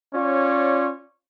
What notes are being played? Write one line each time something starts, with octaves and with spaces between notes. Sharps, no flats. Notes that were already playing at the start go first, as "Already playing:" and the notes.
C#4 F4 C#5 D5